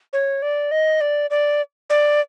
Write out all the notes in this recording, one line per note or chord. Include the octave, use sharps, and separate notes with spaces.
C#5
D5
D#5
D5
D5
D5